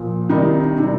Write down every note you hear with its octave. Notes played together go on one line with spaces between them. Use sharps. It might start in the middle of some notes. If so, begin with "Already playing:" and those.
Already playing: A#2 F3
C3 D#3 G3 D#4
C3 D#3 G3